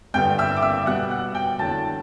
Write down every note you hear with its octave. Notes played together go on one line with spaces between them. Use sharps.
G2 D3 G3 B3 G5 G6
E5 E6
D6
E5 E6
B2 G3 B3 F#5 F#6
F#5 F#6
G5 G6
E2 D3 F#3 A3 A5 A6